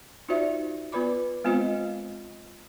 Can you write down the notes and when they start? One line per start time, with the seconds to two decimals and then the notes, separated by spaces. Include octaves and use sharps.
0.28 D#4 F4 F#4 C5 D5 E5
0.92 B3 F4 B4 D5 B5 D6
1.44 G#3 B3 C4 F4 C5 D#5